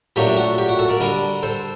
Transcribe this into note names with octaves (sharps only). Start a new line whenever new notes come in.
A#2 F#3 A3 D4 G4
F#4
G4
F#4
F#4 A4
A#4 D5
D3 G3 D4
A4 C5